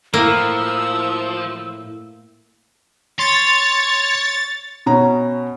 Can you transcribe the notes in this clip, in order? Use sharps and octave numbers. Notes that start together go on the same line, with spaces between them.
A2 F3 A#3 E4 E6
C#5 C6 A6
B2 C#4 A#5